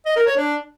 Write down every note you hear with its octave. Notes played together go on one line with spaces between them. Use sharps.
D#5
A#4
C#5
D4